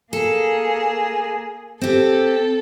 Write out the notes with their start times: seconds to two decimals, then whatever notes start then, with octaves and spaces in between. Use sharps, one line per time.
0.13 A#3 G#4 A4
1.81 C4 G4 A4